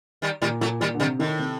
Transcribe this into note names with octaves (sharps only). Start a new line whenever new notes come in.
D#3 G3
A#2 D#3 G3
A#2 F#3 A3
A#2 D#3 G3
D3
C3 D#3 G3
A2 D#3
C3